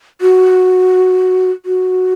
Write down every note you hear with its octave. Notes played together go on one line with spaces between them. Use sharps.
F#4
F#4